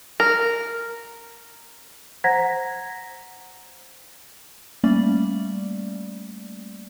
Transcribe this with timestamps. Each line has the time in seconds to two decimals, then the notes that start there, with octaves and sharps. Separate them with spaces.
0.20 A#4
2.24 C5 F#5 A#5 G#6 A#6 B6
4.84 G3 A3 A#3 C#4 D5